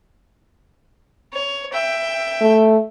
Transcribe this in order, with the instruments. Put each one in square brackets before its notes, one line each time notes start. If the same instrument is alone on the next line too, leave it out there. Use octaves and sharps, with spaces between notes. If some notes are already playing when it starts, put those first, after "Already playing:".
[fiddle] C#5
E5 G5
[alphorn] A3